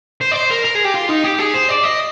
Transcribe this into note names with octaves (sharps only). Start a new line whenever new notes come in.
C5
D5
C5
A#4
A#4
G#4
G4
F4
D#4
G4
G#4
C5
D5
D#5